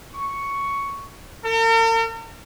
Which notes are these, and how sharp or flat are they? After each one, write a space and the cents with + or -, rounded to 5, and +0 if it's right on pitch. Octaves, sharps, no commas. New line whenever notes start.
C#6 +5
A#4 -45